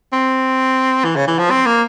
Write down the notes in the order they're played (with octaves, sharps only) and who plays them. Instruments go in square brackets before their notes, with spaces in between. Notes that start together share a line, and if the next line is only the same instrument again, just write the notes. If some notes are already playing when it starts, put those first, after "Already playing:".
[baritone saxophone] C4
E3
C#3
E3
F3
C4
A#3